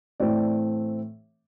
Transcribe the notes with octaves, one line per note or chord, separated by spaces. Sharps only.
A2 E3 A3 C4 D5